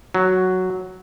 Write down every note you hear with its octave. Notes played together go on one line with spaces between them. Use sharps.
F#3